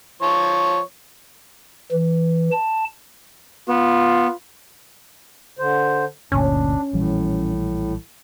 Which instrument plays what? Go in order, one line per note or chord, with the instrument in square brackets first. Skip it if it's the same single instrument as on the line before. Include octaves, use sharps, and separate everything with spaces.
[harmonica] F3 C#5
[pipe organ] E3
A5
[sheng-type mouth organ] B3 [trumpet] F4
[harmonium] D3 C5
[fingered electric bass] G1 D2 A#2 [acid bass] C#4 [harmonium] D4
[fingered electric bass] A#1 E3 G3 [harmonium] A2